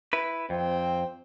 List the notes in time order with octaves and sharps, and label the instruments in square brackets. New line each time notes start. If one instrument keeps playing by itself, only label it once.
[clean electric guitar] E4 B4
[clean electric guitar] F2 [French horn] C4